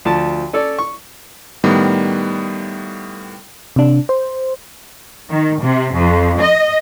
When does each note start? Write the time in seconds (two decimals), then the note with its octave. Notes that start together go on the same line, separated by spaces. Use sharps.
0.05 D2 F3 D5 A5
0.53 C#4 A4 C#5 D5
0.79 C#6
1.64 A2 D#3 G3 B3
3.76 C3 D4
4.09 C5
5.29 D#3
5.61 C3
5.93 F2
6.41 D#5